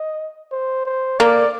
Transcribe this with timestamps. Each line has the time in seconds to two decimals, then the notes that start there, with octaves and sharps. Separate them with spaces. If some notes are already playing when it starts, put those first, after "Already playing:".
Already playing: D#5
0.51 C5
0.85 C5
1.19 A#3 D5